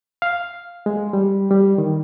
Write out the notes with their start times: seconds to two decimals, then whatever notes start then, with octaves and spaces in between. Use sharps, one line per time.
0.22 F5
0.86 G#3
1.13 G3
1.51 G3
1.78 D#3